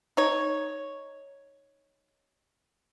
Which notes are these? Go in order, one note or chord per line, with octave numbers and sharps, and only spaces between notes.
D#4 C#5